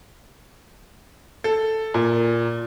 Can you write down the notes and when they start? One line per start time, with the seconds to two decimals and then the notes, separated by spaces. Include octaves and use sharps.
1.44 A4
1.94 A#2